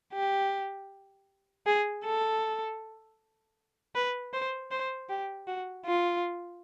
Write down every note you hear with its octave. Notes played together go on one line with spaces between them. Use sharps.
G4
G#4
A4
B4
C5
C5
G4
F#4
F4